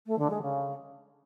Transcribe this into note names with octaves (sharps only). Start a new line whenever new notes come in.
A3
D3
G#3
C#3